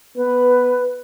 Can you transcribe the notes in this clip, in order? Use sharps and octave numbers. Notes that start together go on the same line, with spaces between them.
B3 B4